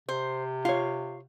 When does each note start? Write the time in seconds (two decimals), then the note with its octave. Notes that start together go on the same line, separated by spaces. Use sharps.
0.09 C3 C5
0.65 F4 C#5 F5